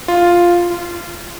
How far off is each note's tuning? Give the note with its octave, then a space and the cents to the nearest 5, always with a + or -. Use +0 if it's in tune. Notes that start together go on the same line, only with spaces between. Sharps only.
F4 +0
F4 -25